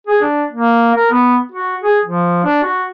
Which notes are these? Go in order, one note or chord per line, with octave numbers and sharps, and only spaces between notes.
G#4
D4
A#3
A#4
B3
F#4
G#4
F3
D4
F#4